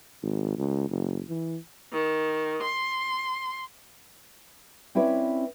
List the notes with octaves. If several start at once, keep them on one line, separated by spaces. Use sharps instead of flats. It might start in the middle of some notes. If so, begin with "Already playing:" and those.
G#1
C#2
F#1
E3
D#3
C6
C4 C#4 E4 B4 C#5 D5